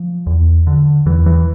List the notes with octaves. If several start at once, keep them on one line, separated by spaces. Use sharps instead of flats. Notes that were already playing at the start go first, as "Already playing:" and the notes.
Already playing: F3
E2
D3
E2 E3
E3